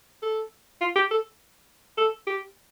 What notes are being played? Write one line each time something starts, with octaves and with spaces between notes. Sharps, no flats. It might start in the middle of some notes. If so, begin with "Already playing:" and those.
A4
F4
G4
A4
A4
G4